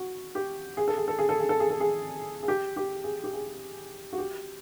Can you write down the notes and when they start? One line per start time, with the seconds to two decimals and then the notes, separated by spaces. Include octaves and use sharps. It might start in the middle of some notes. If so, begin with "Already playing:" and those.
Already playing: F#4
0.35 G4
0.77 G#4
0.88 A4
0.97 G#4
1.08 A4
1.19 G#4
1.29 A4
1.39 G#4
1.49 A4
1.60 G#4
1.70 A4
1.80 G#4
2.43 G#4
2.48 G4
2.77 G4
3.04 G#4
3.24 G4
3.33 G#4
4.13 F#4
4.18 G4